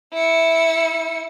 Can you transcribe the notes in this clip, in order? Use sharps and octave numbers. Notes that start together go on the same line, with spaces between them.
E4 C#7